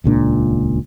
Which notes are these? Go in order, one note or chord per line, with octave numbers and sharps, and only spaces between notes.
D#1 C#2 A#2 D4